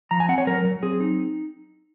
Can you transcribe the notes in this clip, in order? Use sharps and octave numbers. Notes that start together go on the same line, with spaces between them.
F3 A#5
G#5
C4 F#5
C#5
F#3 A#4
F#3
C4 G#4
D#4